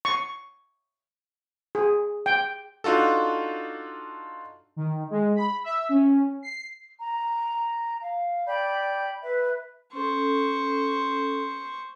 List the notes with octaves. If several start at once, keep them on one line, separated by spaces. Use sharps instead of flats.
C#6
G#4
G5
D4 D#4 F4 F#4 A4
D#3
G#3
B5
E5
C#4
C7
A#5
F5
D5 G5 B5 G6
B4 E5
C#4 A4 C5 C#6